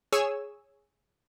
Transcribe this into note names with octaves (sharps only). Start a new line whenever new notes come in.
G#4 C#5 G#5 E6 E7